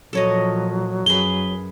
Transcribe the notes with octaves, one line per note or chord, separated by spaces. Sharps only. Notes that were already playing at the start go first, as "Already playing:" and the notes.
A#2 F3 F#3 A4 C#5 D#5
F#2 G#4 B4 G7